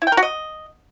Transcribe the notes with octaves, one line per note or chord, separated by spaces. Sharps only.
E4
G5
A#4
F#4
D#5